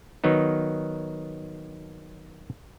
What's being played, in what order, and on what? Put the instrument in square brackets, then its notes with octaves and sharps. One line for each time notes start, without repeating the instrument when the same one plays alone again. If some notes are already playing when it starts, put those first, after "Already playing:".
[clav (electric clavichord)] D#3 F#3 B3 D#4